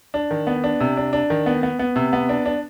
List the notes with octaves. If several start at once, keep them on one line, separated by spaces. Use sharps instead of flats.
D4
D#3
B3
D4
C3
D4
D4
D#3
B3
B3
B3
C3
B3
D4
D4